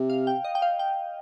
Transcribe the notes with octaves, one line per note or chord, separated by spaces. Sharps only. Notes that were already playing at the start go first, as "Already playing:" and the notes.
Already playing: C3
F5
G5
D#5
G5
F5
G5